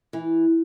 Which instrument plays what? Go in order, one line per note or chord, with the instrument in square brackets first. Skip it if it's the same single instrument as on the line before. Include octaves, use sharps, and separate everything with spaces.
[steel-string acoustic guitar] E3